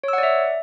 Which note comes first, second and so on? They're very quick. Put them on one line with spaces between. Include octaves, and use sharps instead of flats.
C#5 E6 F#5 D5 E5